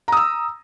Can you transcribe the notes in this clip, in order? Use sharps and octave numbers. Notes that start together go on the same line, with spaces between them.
A#5 D#6 E6